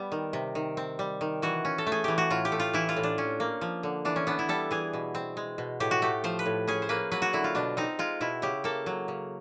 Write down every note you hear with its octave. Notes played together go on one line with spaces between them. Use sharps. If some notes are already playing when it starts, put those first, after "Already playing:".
Already playing: G3 B3
D#3
C3
D#3
C4
G3
D#3
E3 F#4
C#4
A4
A3
G#4
E3 G4
F#4
A2 F4
G4
A3
F4
E3 E4
F4
A2
D4
C#4
A#3
F3
D3
E3 D4
C#4
B3 D4
E4
G3 A4
E3 G#4
B2
C4
G#3
B2
A2 G4
F#4
A3 G4
F3 C5
B4
A2
C#4 G#4
C5
A#3 B4
F#3 B4
F#4
D3 E4
F4
B2 D4
C4 D#4
G#3 F4
B2 E4
C#3 G4
A#3 A4
F#3
C#3